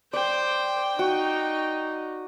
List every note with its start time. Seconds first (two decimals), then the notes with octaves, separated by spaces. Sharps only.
0.13 C5 D5 G5
0.99 D#4 F#4